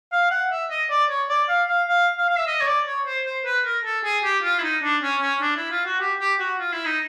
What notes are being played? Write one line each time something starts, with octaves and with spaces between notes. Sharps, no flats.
F5
F#5
E5
D#5
D5
C#5
D5
F5
F5
F5
F5
F5
E5
D#5
C#5
D5
C#5
C5
C5
B4
A#4
A4
G#4
G4
F4
E4
D#4
D4
C#4
C#4
D4
E4
F4
F#4
G4
G4
F#4
F4
E4
D#4